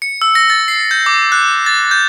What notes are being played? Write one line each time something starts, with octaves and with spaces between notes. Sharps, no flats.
C#7
E6
A#6
A6
C7
G6
D6
F#6
A6
G6